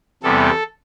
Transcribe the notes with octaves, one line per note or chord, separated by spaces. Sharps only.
E2 C3 E3 G3 B3 A4